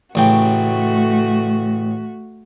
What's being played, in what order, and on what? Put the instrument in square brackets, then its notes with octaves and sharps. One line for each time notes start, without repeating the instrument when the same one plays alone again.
[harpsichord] A1 C#3 G5 [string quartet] A3 F#4